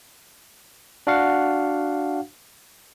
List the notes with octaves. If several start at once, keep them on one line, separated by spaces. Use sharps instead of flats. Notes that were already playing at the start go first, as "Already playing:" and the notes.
D4 F#4 F5 F#5